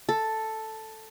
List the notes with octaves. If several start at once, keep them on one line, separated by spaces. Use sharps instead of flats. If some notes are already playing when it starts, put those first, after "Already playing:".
A4